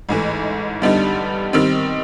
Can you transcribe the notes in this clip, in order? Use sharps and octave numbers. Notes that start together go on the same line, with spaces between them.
A1 G#2 E3 A3
G2 D3 G3 B3 D#4
D#3 G3 C4